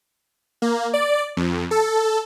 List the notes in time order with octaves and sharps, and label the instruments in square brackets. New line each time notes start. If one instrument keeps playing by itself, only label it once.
[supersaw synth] A#3
D5
F2
A4